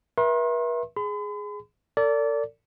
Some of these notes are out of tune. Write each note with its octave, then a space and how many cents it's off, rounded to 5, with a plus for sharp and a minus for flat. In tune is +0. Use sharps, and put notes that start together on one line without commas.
B4 -45 E5 +0 C6 +40
G#4 +0 B5 +45
A4 +45 D5 -25